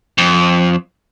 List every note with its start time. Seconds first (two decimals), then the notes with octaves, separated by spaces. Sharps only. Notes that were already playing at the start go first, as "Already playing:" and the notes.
0.18 F2